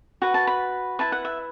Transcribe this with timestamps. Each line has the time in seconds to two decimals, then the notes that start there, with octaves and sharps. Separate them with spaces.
0.22 F#4 B4 F#5
0.34 A5
0.47 B5
0.99 E4 B4 A5
1.12 F#5
1.25 E5